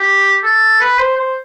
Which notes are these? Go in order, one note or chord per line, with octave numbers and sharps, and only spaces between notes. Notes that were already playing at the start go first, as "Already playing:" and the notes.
Already playing: G4
A4
B4
C5
C5